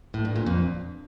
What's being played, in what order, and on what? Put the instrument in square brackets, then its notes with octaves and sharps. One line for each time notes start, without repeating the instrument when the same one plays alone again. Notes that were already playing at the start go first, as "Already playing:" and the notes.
[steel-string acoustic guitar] A2
G2
A#2
F2